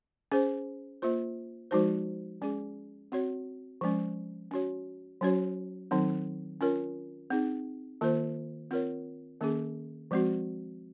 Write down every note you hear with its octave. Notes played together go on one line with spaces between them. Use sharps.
C#4 G#4 C5
A#3 F4 C5
F3 G#3 D#4 F#4 C5
G#3 C#4 G#4
C4 F#4 C#5
F3 G#3 C#4
C#4 F#4 C#5
F#3 C#4 F#4 C#5
D#3 F#3 C4 D#4
C#4 F4 A#4 C#5
C4 D#4 G#4
D#3 A#3 F4 C5
C4 F4 A#4 C#5
D#3 A#3 C#4 G#4
F3 G#3 C4 F#4